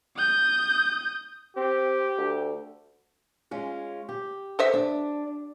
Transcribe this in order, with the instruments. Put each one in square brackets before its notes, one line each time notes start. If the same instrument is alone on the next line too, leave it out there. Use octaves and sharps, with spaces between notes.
[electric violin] D#6 G6
[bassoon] C4 [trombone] G4
[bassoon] D2
[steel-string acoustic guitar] G#3 C#4 F4
G4
[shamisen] A4 C5 E5
[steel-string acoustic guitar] D4